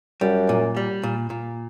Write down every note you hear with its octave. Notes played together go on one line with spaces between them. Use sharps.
F#2 G3
A#2
G3
A#2
A#2